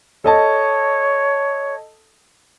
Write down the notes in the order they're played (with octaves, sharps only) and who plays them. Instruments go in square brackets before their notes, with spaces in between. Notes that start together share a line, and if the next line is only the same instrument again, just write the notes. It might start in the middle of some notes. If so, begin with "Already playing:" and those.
[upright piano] A4 D#5 A5 [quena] C#5